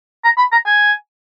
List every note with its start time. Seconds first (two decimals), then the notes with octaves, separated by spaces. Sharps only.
0.24 A#5
0.38 B5
0.52 A#5
0.66 G#5